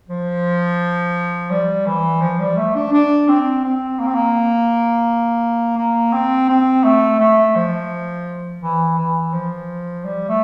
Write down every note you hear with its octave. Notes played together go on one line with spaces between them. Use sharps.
F3
G3
E3
F3
G3
A3
D4
D4
C4
C4
A#3
C4
A#3
A#3
C4
C4
A3
A3
F3
E3
E3
F3
G3
A3